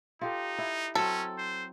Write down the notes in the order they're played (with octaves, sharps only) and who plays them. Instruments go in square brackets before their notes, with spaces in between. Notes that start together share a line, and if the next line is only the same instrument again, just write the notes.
[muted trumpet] D#4 [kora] F4 G4 A4
[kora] E4
[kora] F#3 C4 [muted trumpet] C#4 [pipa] A4
[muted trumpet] C5